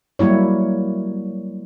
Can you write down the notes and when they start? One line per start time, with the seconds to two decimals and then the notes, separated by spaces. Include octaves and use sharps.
0.19 F#3 G3 A#3 E4 C#5